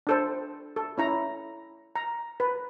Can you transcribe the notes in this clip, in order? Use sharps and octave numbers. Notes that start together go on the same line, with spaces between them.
D4 A4 C5
A4
C#4 E4 A#5
A#5
B4